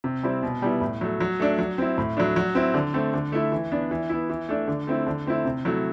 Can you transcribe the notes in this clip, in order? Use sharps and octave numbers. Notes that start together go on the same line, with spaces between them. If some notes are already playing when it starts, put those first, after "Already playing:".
C3
G3 C4 E4
B2
G3 B3 E4
A2
F#3 A3
F#3
A3 D4
F#3
C4 E4
A2
F#3 A3 D4
F#3
C4 E4
D3
A3 C4
D3
A3 E4
E3
B3 D4
E3
B3 E4
E3
A3 D4
D3
A3 C4 E4
D3
A3 C4 E4
C3
F#3 A3 E4